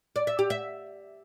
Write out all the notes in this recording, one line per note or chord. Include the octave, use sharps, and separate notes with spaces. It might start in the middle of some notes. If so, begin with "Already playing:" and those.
D5
E5
G4
E5